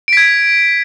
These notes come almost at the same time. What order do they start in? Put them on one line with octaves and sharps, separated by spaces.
D7 B6 G#6